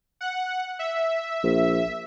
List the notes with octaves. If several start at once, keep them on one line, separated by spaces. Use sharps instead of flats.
F#5
E5
A#1